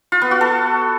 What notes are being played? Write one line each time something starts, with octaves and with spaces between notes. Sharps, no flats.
F4
B3
F#4
A4